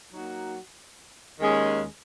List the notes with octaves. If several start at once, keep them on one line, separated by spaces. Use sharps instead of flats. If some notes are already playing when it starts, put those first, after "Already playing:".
F#3 A#3 D#4 F#4
D#2 D#3 G#3 C#4 G#4